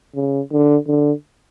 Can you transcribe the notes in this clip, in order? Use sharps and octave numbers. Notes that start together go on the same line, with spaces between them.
C#3
D3
D3